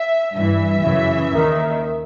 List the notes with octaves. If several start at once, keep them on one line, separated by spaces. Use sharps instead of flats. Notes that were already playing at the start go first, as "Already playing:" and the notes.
Already playing: E5
G2 E3 E5
F#2 C#3 E3
D#2 D#3